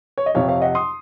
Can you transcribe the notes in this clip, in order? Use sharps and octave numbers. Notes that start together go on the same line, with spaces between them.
C#5
D#5
F2 C3 F3 C#5 F5
C#5 F5
D#5 F#5
C6 D#6